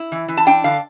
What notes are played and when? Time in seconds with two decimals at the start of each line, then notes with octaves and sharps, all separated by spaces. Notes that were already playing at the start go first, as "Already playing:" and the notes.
Already playing: E4
0.12 E3
0.28 E3
0.37 A5
0.47 D4 G5
0.64 D3 F5